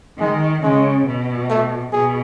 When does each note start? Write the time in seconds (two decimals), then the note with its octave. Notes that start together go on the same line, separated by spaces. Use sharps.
0.19 D#3 G#3
0.63 C#3 G#3
1.07 B2
1.50 A3
1.92 B2 G#4